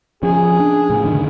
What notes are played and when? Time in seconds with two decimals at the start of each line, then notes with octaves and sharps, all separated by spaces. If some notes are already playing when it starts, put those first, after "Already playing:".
0.23 F3 C#4 G#4
0.60 D4
0.90 A2 C#3
1.04 F1 D3 D#3